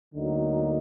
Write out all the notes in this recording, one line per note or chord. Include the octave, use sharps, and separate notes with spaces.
D2 D3 F#3 A#3 D#4